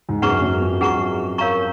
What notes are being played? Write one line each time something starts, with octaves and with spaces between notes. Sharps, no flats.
G#2
F#2 G#4 B4 F#5 A#5 C#6
F#2
F2
F#2 G#4 B4 F#5 A#5 C#6
A#4 C#5 F5 A#5 C#6